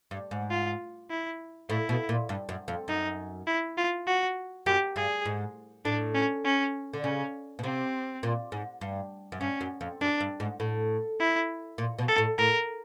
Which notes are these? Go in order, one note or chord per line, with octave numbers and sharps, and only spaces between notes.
G2
G#2
F4
E4
A2 E4
B2
A#2
G2
F#2
F2
F#2 D#4
E4
F4
F#4
F#2 G4
G2 G#4
G#2
A2 D4
C#4
C#4
D3
C#3 C#4
B2
C3 C4
A#2
G#2
G2
F#2
G2 C#4
F#2
F2
F#2 D4
G2
G#2
A2
E4
A#2
B2
A4
A2
A2 A#4